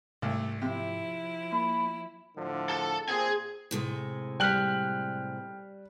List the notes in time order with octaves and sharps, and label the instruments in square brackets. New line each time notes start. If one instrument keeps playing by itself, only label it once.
[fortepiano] C2 [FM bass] G#2 [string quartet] A3
[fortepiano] C3 [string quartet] F3 E4
[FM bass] A#3 [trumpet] B5
[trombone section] A2 D3 F3
[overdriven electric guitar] A4
[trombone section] A#2 C4 [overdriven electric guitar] G#4 G#5
[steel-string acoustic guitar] A2 C3 G#3
[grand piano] G3 F#6 F#7 [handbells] G5 F6 B6